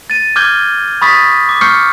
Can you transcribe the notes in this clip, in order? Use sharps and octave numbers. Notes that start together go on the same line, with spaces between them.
A6 D#7
D6 F6 G6 G#6 G7
B5 C#6 D#6 A6 B6
D6
C#6 D6 F6 G6 C7 C#7